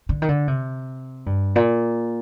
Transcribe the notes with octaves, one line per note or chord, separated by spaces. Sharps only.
D3
D#3
D3
C3
G2
A#2